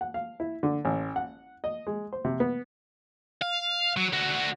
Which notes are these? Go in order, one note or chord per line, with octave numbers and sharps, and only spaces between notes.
F#5
F5
E4
D3
A1
F#5
D#5
G#3
C5
C3
B3
F5
F#3
D3 F#4